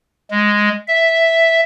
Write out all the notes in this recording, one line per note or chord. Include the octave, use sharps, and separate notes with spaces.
G#3
E5